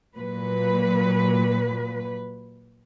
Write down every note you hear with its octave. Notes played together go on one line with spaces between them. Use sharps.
A#2 F#3 B4